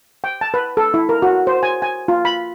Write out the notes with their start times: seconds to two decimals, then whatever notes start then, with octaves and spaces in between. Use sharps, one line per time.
0.24 G5
0.41 A5
0.54 B4
0.77 A4
0.94 E4
1.09 A#4
1.22 F#4
1.47 C5
1.63 G#5
1.82 G#5
2.08 F4
2.25 B5